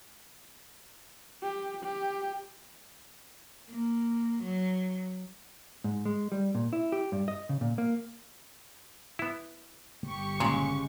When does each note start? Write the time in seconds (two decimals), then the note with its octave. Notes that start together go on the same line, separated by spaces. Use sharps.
1.43 G4
1.83 G4
3.70 A#3
4.43 F#3
5.84 G#2
6.05 G#3
6.32 G3
6.55 A#2
6.73 E4
6.92 G4
7.12 G2
7.28 D#5
7.49 C#3
7.61 A#2
7.78 A#3
9.19 B3 E4
10.04 G1 G4 C#6
10.40 A#2 C#3 G#3